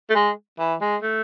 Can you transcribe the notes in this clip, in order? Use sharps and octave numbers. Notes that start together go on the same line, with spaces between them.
A3
G#3
E3
G#3
A3